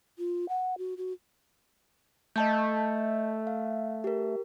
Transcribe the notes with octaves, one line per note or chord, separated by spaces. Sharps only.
F4
F#5
F#4
F#4
A3 D#5 A5 G6
F5
G4 A#4